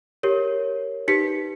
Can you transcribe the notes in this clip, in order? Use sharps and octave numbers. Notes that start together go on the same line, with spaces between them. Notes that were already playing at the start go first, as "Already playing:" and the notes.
G4 A#4 C#5
D#4 G4 B4 B6 C#7